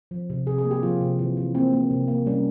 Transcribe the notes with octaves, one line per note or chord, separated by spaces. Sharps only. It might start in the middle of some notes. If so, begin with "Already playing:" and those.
F3
C3
C3 G#4
G#4
A#3
G4
F3 F4
C3
E3
E3
A#3 C4
A#3
C3
A#3
G3 C#4